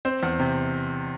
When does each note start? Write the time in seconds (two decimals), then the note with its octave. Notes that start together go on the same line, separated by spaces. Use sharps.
0.05 C4 C5
0.23 E2
0.39 C3